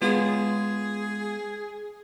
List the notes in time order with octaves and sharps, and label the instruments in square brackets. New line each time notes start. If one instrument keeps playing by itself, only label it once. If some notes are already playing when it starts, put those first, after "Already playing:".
[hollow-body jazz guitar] G#3 B3 F4 [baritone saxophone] G#4